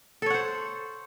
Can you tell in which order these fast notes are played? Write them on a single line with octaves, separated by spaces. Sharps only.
A4 C#5 F#5 C5